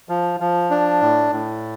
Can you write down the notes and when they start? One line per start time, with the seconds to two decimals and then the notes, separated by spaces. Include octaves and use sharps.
0.09 F3
0.40 F3
0.71 D4
1.02 A2
1.32 A2